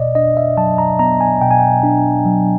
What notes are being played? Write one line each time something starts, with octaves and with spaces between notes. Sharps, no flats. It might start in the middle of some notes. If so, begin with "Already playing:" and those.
Already playing: B2 D5 D#5
D4 D#5
E5
F#3 A5
A#5
B3 A#5
G#5
B2 G5
G#5
G5
D4
F#3